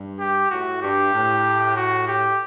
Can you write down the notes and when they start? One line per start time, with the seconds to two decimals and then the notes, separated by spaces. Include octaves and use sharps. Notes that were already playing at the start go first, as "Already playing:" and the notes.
Already playing: G2
0.19 G4
0.50 A2 F#4
0.82 G2 G4
1.14 A2
1.76 F#4
2.08 G4